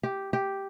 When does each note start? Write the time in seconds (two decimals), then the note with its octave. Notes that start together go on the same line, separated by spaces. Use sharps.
0.03 G4
0.33 G4